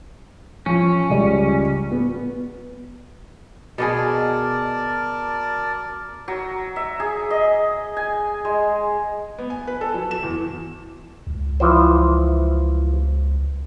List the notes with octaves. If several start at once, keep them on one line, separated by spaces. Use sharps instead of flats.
F3 C#4
C#2 G3 D5
B3
B2 B3 G#4 A#4 D5 A5
F#3
E5
G#4
D#5
G#5
G#3
B3
G#5
B4
A4
F#3
E7
E2
C#2
E3 F3 C5